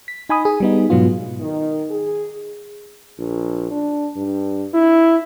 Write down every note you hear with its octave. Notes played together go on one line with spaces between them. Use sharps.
B6
D#4 G#5 B5 D#6
G#4
G3 B3 D#4
G#2 B2 F#3 B3 F4
D#3
G#4
A#1
D4
G2
E4